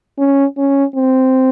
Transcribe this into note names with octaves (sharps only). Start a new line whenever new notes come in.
C#4
C#4
C4